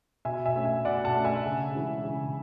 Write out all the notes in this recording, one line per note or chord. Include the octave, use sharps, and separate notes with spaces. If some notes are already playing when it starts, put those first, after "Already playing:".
B2 E5 G#5
E5 G#5
A3 C#4
E5 G#5
B2 D5 F#5
F#5 A5
A3 C#4
E5 G#5
C#3
E3 G#3 C#4
C#3